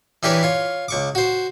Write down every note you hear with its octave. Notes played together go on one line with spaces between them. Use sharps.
E3 D4 G4 A#4 B4 C#5
F4 C#5
C#2 C#6 D6
F#4 C5